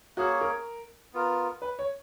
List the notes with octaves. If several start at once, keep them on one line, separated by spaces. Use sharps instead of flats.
A#3 C#4 F#4 G#4 C#5
A#4
B3 F4 A#4
B4
C#5